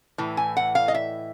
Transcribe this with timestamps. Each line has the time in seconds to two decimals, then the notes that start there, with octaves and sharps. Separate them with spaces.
0.18 A2 E3
0.37 G#5
0.57 F#5
0.75 F5
0.88 D#5
0.94 E5